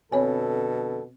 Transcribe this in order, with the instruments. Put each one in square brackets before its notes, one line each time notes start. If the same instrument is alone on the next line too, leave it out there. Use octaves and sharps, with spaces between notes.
[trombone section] F2 D3 A4 [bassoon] B2 [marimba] C4 C#5 G#5